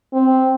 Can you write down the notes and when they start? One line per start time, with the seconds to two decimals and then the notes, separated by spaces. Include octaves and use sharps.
0.13 C4